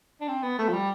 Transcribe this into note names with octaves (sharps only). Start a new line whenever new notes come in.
D4
C4
B3
A3
F3
G3